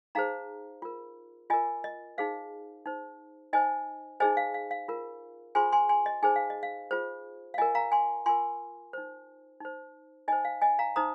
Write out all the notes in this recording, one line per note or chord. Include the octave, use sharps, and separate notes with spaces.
D#4 G#4 C5 F5 A#5
F4 A#4
F4 A#4 D#5 G#5
D#5
D#4 G#4 C5 F5
D#4 C5
D#4 C5 D#5 G#5
D#4 G#4 C5 D#5 G#5
F5
F5
F5
F4 A#4
F4 G#4 C5 G#5 C6
G#5 C6
G#5 C6
D#5
D#4 G#4 C5 G#5
F5
D#5
F5
F4 G#4 C5
F5
F4 A#4 D#5 G#5
F5 A#5
G#5 C6
F4 A#4 G#5 C6
D#4 C5
D#4 C5
D#4 C5 D#5 G#5
F5
D#5 G#5
F5 A#5
D#4 C5 A#5 D#6